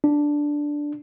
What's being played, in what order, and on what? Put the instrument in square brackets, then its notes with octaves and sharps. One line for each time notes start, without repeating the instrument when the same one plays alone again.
[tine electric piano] D4